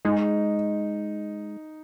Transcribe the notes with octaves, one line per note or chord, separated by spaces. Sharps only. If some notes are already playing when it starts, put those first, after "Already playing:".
G#3 D#4